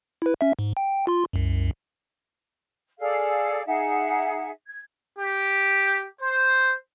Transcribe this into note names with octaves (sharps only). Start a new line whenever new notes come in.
E4 B4
C#4 E5
G#2
G5
F4 C6
C2 F#2
G#4 A4 D5 F5
D#4 G#4 E5 F#5
G#6
G4
C5